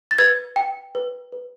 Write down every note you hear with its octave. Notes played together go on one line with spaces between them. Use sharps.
A6
B4 G#6
G5
B4
B4